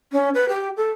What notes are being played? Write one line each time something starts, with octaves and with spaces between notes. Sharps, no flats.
C#4
B4
G4
A4